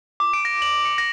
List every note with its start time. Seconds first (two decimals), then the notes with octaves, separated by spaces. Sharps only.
0.20 D6
0.33 D7
0.45 A#6
0.62 F#7
0.85 C#7
0.98 A#6